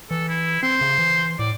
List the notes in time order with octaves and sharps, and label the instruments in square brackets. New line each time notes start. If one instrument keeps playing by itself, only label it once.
[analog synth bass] E3 [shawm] A4
[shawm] E4
[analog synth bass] C4 [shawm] C5
[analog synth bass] C#3
E3
[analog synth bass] A2 [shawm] D5